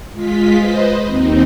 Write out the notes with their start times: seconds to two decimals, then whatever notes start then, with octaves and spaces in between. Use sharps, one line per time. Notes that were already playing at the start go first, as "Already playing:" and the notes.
0.13 G#3 F4 B6
0.56 B4 C5 D#5
1.04 D#2 C4 D#4